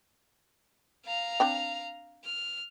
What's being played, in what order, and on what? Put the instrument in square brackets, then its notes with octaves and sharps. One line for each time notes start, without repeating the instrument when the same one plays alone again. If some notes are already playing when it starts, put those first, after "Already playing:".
[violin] F5 A#5
[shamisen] C4 D4 G5
[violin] F6